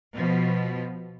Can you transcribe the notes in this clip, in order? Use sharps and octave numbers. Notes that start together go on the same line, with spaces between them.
B2 F3